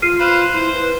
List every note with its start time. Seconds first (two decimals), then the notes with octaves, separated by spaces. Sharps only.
0.02 F4 F6 C7 D#7
0.20 B4 C5 F5
0.54 E4 C5
0.74 B4